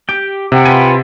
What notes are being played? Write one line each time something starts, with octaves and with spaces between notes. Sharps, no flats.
G4 G5 D7
C3 F#5 G5
F4 B4 G#5